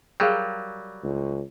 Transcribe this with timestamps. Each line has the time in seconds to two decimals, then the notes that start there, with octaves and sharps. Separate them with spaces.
0.20 F#3 G3 G#4 A#4 D5 F5 G5
1.03 C#2